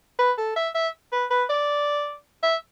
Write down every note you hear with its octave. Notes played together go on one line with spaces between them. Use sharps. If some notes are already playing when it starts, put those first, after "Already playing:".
B4
A4
E5
E5
B4
B4
D5
E5